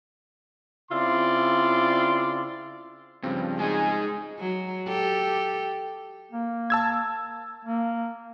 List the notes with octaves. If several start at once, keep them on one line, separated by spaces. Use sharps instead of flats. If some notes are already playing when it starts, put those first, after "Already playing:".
C#3 C4 E4 F4 D5 C6
G2 C#3 F3 C4
G#3 D#4 G#4 G#5
F#3
G4 A4
A#3
A5 E6 G#6
A#3